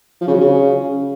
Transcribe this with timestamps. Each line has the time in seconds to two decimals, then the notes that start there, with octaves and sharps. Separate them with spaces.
0.21 F3
0.28 C#3
0.34 F#3
0.40 C#3